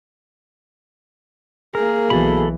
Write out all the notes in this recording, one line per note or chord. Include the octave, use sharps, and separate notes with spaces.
A#3 G#4 A#4
B1 B2 E3 A4 B5